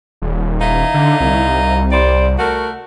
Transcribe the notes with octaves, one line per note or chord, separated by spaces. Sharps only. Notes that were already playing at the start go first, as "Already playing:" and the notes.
D#1
D#4 E4 F5
D3
C2
G3 C5 D5
A3 F#4 A#4